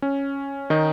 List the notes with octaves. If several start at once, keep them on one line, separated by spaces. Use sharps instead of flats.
C#4
D#3 D#4